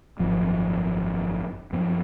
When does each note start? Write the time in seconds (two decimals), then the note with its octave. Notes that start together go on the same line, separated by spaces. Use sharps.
0.19 G#1 F#2 F3
1.73 F#2 F3 B3